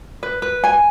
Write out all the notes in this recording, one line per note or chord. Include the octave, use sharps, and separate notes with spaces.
B4
B4
G#5